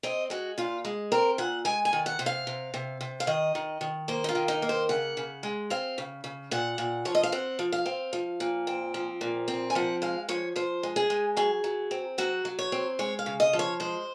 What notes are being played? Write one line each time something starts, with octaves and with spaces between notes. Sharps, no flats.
C4 D#5
G#3 F#4
A#2 F4
G#3
C4 A#4
A#2 F#5
G#3 G#5
G#5
D#3
F#5
C3
F5
C3
C3
C3
F5
D#3 D#5
D#3
D#3
A#3 C5
D#4
F4
D#3
D#4
A#3
C5
C#3 F#5
C#3
G#3
C4 F5
C#3
C#3
A#2 F#5
A#2
F3 C#5
D#5
F5
C4 F#5
F3
F5
C4
F3
A#2
C4
F3
A#2
C4
G#5
F3 F#5
G#3 F5
F3 C#5
F3 C5
G#3
G#4
G#3
F#3 G#4
F#3
C4
F#3 F#4
F#3
C#5
C4
G#3 C#5
F5
C#3
D#5
F3
C#5
G#3 C5